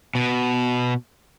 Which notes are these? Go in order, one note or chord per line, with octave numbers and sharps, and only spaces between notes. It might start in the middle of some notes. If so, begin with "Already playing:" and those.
B2